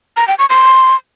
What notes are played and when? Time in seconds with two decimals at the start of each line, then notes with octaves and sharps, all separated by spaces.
0.17 A#5
0.28 G5
0.39 C#6
0.50 C6